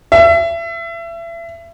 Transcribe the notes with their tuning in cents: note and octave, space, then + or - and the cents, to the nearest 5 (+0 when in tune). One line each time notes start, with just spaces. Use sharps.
E5 +30